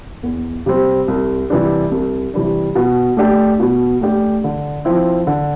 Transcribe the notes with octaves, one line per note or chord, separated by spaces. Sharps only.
E2
C3 G3 C4
C2
C3 E3 G3 D4
C2
C3 E3 G3 D4
B2
A3 D4 G4
B2
A3 D4 G4
D3
F3 C4 E4
D3